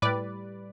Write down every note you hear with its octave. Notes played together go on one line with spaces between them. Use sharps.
A2 G3 B4 D5